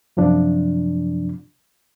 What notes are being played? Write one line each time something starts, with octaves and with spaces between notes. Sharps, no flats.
F#2 C3 F3 D4